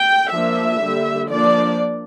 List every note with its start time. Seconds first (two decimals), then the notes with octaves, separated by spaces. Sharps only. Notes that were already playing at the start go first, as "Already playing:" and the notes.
Already playing: G5
0.31 F3 A#3 D4 E5
0.80 D3 G3 A#3
1.29 F3 A#3 D4 D5